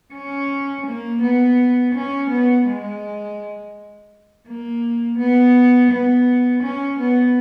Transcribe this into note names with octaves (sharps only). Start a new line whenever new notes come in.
C#4
A#3
B3
C#4
B3
G#3
A#3
B3
B3
C#4
B3